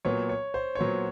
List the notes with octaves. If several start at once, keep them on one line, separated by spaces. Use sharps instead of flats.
A#2 F#3 B3 C#5
C#5
C5
C#5
A#2 F#3 B3 C5